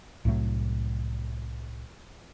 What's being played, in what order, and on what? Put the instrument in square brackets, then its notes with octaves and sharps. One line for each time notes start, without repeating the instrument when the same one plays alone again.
[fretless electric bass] C2 A2 F#3 A3